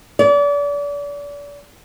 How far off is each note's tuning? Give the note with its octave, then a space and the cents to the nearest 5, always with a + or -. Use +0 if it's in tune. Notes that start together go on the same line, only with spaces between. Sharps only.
D5 -35